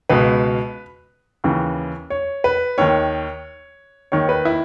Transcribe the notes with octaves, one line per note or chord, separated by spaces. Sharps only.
C#2 B2 B4
D#2 C#3 E3
C#5
B4
D#2 D#3 C#5
D#2 D#3 C#5
B4
E4